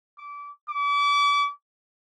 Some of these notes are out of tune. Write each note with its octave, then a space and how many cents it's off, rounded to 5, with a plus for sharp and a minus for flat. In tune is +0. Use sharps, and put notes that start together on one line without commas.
D6 -25
D6 -35